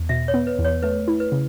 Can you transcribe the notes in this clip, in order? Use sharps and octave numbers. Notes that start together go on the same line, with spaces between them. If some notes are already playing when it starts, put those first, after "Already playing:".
Already playing: E2
B2 E5
C#5
B3
B4
E2
C#5
A3 B4
E4
B4
C#3